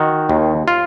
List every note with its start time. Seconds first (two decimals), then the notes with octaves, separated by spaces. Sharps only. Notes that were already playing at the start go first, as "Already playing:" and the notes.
Already playing: D#3 F#4
0.29 D#2
0.68 F4